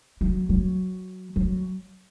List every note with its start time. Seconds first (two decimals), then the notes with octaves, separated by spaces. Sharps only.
0.21 F#3
0.49 F#3
1.36 F#3